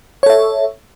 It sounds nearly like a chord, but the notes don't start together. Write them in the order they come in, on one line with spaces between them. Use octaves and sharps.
C#5 A4 E5